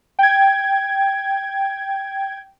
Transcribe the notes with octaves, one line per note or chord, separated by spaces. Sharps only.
G5 G#6